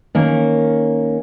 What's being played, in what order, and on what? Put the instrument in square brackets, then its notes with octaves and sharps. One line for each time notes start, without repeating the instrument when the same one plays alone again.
[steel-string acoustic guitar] D#3 A#3 C#4